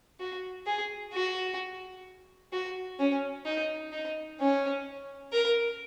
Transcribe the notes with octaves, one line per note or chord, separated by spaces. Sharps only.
F#4
G#4
F#4
F#4
C#4
D#4
D#4
C#4
A#4